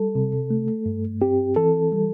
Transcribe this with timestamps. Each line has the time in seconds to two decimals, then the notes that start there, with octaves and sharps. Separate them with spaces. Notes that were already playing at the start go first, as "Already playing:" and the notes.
Already playing: G3 A4
0.15 C3
0.50 A3
0.86 G2
1.21 C4 G4
1.56 E3 A4
1.92 G3